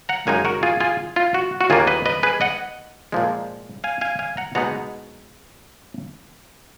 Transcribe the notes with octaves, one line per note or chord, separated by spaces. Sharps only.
F#5 A#5
F#2 D#3 G#3 D#4 F5 G#5
F#4 A#4
F4 G#4
F4 G#4
F4
F#4
F#4
D#2 D#3 A#3 F4 G#4
B4 D#5
B4 D#5
G#4 B4
D#5 F#5
A#2 F3 G#3
F5 G#5
F5 G#5
F5 G#5
F#5 A#5
B2 G#3 B3 D#4 F#5 A#5